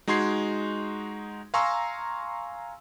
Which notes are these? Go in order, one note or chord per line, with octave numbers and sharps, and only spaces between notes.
G#3 D#4 F#4 C6 G#6 C7
F5 G#5 A#5 C6 C#6 E6